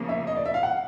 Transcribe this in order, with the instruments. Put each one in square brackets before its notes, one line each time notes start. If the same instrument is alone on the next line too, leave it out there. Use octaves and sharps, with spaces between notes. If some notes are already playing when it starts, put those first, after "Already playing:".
Already playing: [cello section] C#3 F3 A#3
[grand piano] E5
D#5
D5
E5
F5
F#5